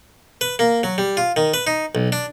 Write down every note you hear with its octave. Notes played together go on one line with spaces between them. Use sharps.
B4
A#3
F#3
G3
F4
D#3
B4
D#4
B1
D4